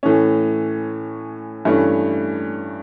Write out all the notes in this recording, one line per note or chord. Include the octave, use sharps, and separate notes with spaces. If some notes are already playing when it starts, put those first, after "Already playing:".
A2 E3 A3 C#4
G2 E3 A3 C#4